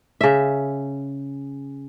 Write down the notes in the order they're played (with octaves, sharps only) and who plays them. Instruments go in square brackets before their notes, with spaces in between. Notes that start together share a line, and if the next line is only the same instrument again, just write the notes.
[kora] C#3 E5